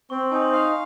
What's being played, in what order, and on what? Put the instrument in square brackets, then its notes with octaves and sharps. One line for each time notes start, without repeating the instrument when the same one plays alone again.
[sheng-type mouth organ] C4 [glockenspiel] C#6
[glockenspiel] C6
[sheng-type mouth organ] D#4 [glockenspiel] G#5
[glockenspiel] C6
[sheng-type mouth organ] F5 [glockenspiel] C6